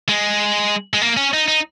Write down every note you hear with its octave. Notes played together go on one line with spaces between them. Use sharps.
G#3
G#3
A#3
C#4
D#4
D#4